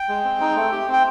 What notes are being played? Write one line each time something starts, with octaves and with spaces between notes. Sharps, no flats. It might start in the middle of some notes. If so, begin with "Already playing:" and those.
Already playing: G5
G#3
C4
D#4
A3
G4
C4
G5